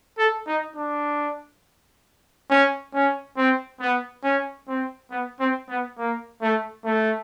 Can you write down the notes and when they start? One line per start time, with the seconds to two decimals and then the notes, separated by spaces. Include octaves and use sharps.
0.18 A4
0.47 D#4
0.76 D4
2.50 C#4
2.94 C#4
3.37 C4
3.80 B3
4.24 C#4
4.68 C4
5.11 B3
5.40 C4
5.69 B3
5.98 A#3
6.42 A3
6.85 A3